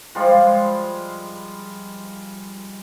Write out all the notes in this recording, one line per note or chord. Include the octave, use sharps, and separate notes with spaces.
F3 G3 G#3 F4